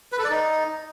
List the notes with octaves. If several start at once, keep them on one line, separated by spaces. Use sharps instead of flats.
B4
A4
D5
D#4